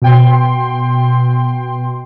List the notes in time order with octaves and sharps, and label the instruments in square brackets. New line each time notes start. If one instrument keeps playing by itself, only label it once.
[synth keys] B2 G5 C6